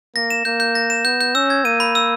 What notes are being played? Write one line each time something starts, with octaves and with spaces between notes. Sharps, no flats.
A#3 A#6
E7
A#3 G6
G6
A#6
E7
B3 G6
G6
C#4 E6
G#6
A#3 D#7
B5
E6